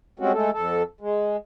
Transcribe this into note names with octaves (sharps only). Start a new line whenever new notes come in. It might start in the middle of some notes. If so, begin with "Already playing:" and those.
G3 G#3 C4 C#4 F#4
G#3 A3 A4
F2 A4
G#3